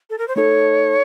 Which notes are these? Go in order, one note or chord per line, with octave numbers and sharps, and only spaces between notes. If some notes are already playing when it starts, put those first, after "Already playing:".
A4
A#4
C5
A3 D#4 A4 C#5